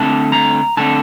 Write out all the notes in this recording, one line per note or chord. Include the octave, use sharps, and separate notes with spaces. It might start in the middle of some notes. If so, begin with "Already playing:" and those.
Already playing: D3 A3 C4 A5
A#5
D3 A3 C4 A5